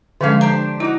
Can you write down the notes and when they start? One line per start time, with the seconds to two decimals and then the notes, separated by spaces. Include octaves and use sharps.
0.21 D3 F3 G#3 A3 C#4 F5
0.41 D4 G4 C5 A#5
0.80 D#4 E4 F#4